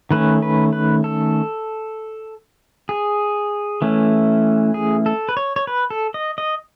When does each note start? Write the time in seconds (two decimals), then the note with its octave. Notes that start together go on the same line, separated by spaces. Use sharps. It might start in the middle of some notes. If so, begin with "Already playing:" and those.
0.11 D#3 A3 C#4 B4
0.42 B4
0.73 B4
1.04 A4
2.89 G#4
3.82 E3 A3 C#4
4.74 G#4
5.06 A4
5.29 B4
5.37 C#5
5.56 C#5
5.67 B4
5.90 A4
6.14 D#5
6.38 D#5